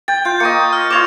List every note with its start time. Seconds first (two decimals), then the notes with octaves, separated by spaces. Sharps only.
0.08 G5 A6
0.25 F4 G6
0.40 A#3 D#5 C#6 C#7
0.73 F6
0.90 F4 C#5 D5 D6 F7